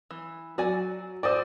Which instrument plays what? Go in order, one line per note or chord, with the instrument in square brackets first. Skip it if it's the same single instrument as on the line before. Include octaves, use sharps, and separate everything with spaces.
[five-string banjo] E3
[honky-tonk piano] F#3 [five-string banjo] F#4 D5 G#5
[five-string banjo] F#4 A4 C5 [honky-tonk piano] D5 D#6